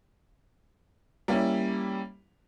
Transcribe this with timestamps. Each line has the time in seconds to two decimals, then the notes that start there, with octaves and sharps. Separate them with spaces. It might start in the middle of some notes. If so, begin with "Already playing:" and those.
1.28 G3 A#3 C#4 E4